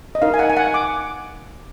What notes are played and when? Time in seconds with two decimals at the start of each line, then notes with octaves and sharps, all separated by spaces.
0.15 D#5
0.22 D#4 A#4 F5
0.34 G#5
0.39 F#5
0.50 G#5
0.57 F#5
0.74 D6